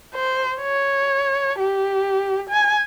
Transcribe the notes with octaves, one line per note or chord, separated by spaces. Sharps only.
C5
C#5
G4
G#5